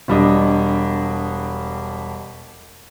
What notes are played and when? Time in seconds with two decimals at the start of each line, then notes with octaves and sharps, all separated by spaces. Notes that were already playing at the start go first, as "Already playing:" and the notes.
0.08 E1 G3 D4 D#5